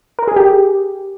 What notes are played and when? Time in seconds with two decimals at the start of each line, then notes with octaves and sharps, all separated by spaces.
0.19 A#4
0.28 G#4
0.36 G4